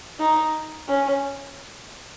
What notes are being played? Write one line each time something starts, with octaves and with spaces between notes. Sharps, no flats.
D#4
C#4